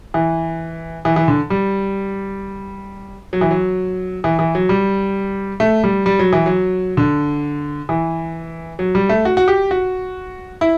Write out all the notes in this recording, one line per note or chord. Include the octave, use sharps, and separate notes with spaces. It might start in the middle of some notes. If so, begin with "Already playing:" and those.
E3
E3
E3
D3
G3
F#3
E3
F#3
E3
E3
F#3
G3
A3
G3
G3
F#3
E3
F#3
D3
E3
F#3
G3
A3
F#4
F#4
G4
F#4
E4